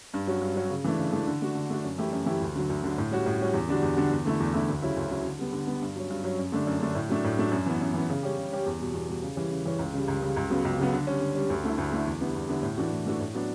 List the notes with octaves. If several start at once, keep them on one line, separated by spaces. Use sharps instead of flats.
G2
F#3 C#4 F#4
G2
F#3 C#4 F#4
C#3
E3 A3 D4
C#3
E3 A3 D4
D3
A3 D4 F#4
D3
A3 D4 F#4
F#2
E3 A3 E4 G4
F#2
E3 A3 E4 G4
D2
D3 F#3
D2
D3 F#3
A2
G3 C#4 F#4
A2
G3 C#4 F#4
E2
D3 G3 D4 F#4
E2
D3 G3 D4 F#4
E2
D3 A3 E4
E2
D3 A3 E4
D2
C#3 F#3 C#4 E4
D2
C#3 F#3 C#4 E4
D3
G3 B3
D3
G3 B3
G2
F#3 C#4
G2
F#3 C#4
F#2
D3 A3 D4
F#2
D3 A3 D4
A2
F#3 A3 D4
A2
F#3 A3 D4
F#2
E3 B3
F#2
E3 B3
C#3
G3 C#4 G4
C#3
G3 C#4 G4
E2
B2 G3
E2
B2 G3
C#3
E3 G3 C#4
C#3
E3 G3 C#4
C#2
C#3 G3
C#2
C#3 G3
C#2
C#3 F#3 B3
C#2
C#3 F#3 B3
D3
G3 C#4
D3
G3 C#4
D2
D3 A3 E4
D2
D3 A3 E4
E2
D3 G3 B3 E4
E2
D3 G3 B3 E4
A2
E3 A3 D4 F#4
A2
E3 A3 D4 F#4
A2
F#3 B3 D4